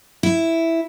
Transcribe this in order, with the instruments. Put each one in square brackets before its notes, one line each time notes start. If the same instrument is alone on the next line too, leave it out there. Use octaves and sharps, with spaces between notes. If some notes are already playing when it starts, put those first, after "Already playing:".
[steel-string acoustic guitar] E4